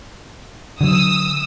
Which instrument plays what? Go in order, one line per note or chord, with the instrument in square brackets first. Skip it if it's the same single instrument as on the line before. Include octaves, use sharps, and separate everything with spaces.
[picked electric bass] D3 F#3 [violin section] D#6 E6